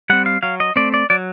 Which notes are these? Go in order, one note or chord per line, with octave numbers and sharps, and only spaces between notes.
G3 C4 F#5
F5
F#3 F5
D#5
A3 C4 D5
D5
F#3 D5